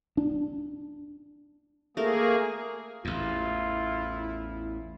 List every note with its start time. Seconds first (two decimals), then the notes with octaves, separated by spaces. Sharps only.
0.17 D4
1.97 A3 A#3 G#4 A#4
3.05 A1 E2 E4 F4